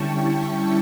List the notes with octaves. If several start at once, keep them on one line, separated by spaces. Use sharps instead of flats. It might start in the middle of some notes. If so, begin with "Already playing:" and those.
Already playing: D3 G3 C#4 E4 G5 A5 C#6
E5